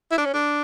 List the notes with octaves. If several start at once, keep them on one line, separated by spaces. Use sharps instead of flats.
E4
D4
C#4
D4